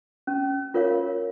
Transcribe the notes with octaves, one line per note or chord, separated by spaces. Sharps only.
C#4
F4 A#4 C#5 F5